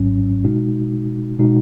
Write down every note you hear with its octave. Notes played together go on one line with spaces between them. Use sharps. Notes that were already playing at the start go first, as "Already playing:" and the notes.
Already playing: G#1 G#2 F#3 C#4
B2 G#3 D#4 F#4
B2 G#3 D#4 F#4